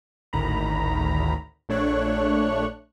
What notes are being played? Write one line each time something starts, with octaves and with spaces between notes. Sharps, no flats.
G#1 D2 A2 D#3 A#5 B5
A#1 A3 D4 C#5 C#6 F#6